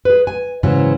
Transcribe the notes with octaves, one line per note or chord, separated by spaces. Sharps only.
G#4 B4
G#5
G#2 C#3 E3 F#3